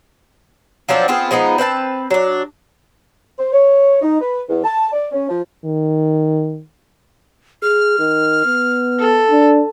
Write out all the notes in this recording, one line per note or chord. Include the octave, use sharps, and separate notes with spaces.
F3 F#3 C4 D4
B3 C4 F4 G#4
F3 G#3 B3 D#4
C4 B4 F5 A5
F#3 D4
C5
C#5
D#4
B4
E2
A5
D5
C#4
F3
D#3
G#4 F6
D#3
B3
A4
D4